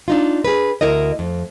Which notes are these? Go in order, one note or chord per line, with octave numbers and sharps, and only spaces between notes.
D4 D#4 F4
G#4 B4
D2 E4 A#4 D#5
F2